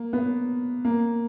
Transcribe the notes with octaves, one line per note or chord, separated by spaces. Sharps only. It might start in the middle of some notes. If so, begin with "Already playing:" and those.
Already playing: A#3
B3
A#3